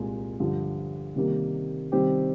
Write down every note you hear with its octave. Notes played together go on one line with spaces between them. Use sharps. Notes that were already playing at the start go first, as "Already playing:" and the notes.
Already playing: C2 A#2 G#3
G2 D3 F3
C3 D#3 G3 A#3
C3 D#3 G3 C4 G4